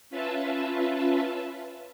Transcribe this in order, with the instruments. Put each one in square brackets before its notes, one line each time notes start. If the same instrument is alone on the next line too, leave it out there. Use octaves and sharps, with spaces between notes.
[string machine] C#4 F4 B4 E5 A5